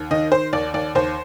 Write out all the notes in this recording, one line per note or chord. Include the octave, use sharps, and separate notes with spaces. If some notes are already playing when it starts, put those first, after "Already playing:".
Already playing: D#2
D#3 D#5
D#3 C5
D#2 D5
D#2 D5
D#2 C5